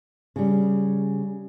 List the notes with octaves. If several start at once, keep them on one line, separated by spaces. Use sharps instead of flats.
C#3 G3